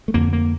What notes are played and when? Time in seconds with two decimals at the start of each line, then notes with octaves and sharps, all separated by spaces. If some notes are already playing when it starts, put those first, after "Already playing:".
0.08 A3
0.14 F2 D3 A#3
0.33 A#3